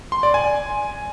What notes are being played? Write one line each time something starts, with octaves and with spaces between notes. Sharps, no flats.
C6
D5
G#5